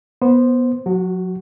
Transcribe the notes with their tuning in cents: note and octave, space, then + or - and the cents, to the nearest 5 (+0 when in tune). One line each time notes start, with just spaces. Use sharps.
B3 -10 C5 +0
F#3 -30 F#4 +20